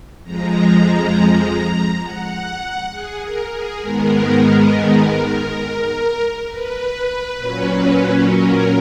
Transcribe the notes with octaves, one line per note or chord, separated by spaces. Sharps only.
F2 F3 G#3 A#5
F#5
G#4
A#4
G#4
G#2 D#3 G#3 B3 A#4
B4
A#2 F#3 C#4
A#4